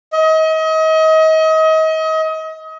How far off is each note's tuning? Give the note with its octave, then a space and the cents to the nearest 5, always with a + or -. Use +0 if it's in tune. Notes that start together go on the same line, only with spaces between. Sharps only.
D#5 +35